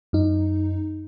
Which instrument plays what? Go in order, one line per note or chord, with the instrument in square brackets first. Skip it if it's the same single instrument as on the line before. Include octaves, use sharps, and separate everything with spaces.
[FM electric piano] F#2 D#4